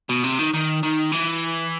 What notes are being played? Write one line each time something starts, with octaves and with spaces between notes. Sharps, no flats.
B2
C3
D#3
D#3
D#3
E3